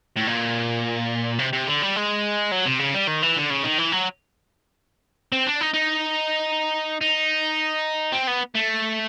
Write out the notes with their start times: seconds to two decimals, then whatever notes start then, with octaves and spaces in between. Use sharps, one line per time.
0.16 A2
0.27 A#2
1.39 C3
1.53 C3
1.67 D3
1.82 G3
1.96 G#3
2.52 F#3
2.66 C3
2.79 C#3
2.94 G3
3.07 D#3
3.22 E3
3.36 D3
3.50 C#3
3.64 D#3
3.79 E3
3.92 F#3
5.32 C4
5.46 D4
5.61 D#4
5.74 D#4
7.01 D#4
8.12 C4
8.28 B3
8.55 A3